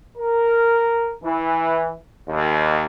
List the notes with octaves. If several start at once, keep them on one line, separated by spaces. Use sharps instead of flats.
A#4
E3
D#2